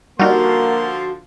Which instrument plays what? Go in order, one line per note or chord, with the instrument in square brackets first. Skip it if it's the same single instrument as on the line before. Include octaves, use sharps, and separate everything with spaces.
[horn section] D3 F3 C6 [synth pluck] G3 D#4 [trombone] A#3 [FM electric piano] F#4 F5